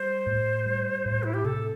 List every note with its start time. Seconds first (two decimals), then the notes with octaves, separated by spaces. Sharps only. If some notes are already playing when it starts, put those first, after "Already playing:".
Already playing: G3 C5
0.27 A2
0.66 G3
1.06 A2
1.23 E4
1.34 G4
1.44 C3 A4